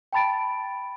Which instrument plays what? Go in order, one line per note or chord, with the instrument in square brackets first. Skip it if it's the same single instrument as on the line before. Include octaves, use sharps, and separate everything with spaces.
[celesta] G5 A5 B5 A6 D7